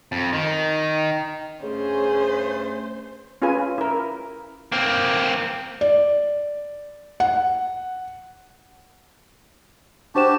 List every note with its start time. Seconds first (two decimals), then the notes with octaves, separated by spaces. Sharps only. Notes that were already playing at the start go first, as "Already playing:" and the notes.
0.12 F2
0.33 D#3
1.63 G2 C#3 A3 C#4 G#4 C5
3.42 C#4 F4 G#4 B4 G#5
3.78 E4 A#4
4.72 A#3 C4
5.81 D5
7.20 F#5
10.15 D4 F#4 G4 C5 A5 E7